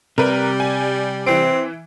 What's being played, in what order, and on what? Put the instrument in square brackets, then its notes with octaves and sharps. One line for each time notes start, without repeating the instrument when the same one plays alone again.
[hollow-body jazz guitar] C3 [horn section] G3 [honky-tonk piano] A#4 B4
[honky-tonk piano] G#5
[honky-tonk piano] E3 D7 [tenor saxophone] C4